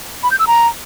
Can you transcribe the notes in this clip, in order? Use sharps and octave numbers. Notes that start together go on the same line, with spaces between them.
B5
G6
E6
A#5